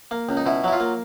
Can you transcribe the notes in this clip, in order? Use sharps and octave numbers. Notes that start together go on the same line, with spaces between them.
A#3
C#2
D#4
B2 E4
F#3 E4
F4
A#3